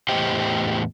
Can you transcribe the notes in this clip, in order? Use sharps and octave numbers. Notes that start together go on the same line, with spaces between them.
E2 A2 G4 C5 D#5 G5